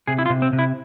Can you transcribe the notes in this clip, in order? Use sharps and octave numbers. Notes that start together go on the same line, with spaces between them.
C3 G#4
E4
F4
C3
C4
C3
E4